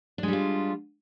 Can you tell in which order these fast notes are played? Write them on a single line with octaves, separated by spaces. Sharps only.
D4 G#3 G3 F4